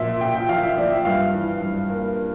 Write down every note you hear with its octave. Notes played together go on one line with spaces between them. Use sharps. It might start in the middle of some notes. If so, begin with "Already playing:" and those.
Already playing: A#2 F3 E5
A#2 G5
G5
F3 F5
E5
F3 D5
E5
G2 F5
E3
G2
A#3